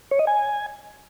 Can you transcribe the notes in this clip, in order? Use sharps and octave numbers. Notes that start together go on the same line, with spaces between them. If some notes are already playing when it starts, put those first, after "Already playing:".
C#5
D#5
G#5